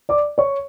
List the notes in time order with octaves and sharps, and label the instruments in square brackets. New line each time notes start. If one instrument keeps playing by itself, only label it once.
[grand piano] D5 D6
C#5 C#6